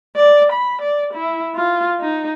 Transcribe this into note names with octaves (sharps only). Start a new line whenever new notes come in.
D5
B5
D5
E4
F4
D#4